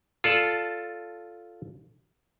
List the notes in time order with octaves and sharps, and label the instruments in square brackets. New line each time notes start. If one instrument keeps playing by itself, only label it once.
[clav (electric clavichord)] F4 A4 D5 A5